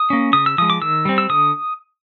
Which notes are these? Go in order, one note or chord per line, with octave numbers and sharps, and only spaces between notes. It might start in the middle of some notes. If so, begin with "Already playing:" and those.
Already playing: D#6
A#3 C#4
C#3 D#6
E6
F3 G#3 D#6
D6
D#3 E6
G3 C4
E6
D3 D#6